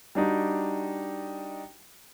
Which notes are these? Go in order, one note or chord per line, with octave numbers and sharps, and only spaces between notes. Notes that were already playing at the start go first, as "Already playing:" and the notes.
G3 D4 D#4 F#4